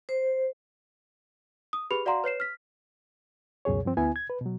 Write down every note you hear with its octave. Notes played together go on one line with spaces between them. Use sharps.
C5
D#6
G4 G#4 B4 B5 F7
F#4 D5 F5 F#5 A#5 C6
B4 C#5 C7 E7
F6 B6
C#2 F#2 B2 G#4 C#5
G2 F3 C4
D2 B3 E4 G#5
G#6
B4
B2 F#3